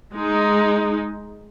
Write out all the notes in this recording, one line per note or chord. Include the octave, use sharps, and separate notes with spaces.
G#3 D#4